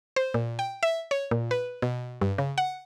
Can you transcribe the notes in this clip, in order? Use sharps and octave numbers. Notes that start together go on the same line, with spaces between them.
C5
A#2
G5
E5
C#5
A#2
B4
B2
G2
C#3
F#5